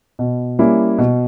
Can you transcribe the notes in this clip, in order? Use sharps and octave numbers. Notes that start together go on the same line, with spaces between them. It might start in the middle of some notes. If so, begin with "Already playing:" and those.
B2
G3 A#3 C#4 E4
B2